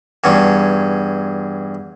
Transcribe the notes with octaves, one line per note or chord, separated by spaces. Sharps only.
E2 G2 C#4